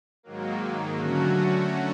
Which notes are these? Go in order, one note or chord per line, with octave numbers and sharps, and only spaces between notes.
G#2 D#3 F#3 A#3
D3 F#3 A3 C#4 F#4